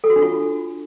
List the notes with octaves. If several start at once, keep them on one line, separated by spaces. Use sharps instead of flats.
A4
F#4
D4
F4